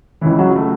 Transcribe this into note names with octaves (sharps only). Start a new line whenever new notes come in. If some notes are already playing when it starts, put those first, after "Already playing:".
C#2 C#3 E3 E4
F#3 F#4
A3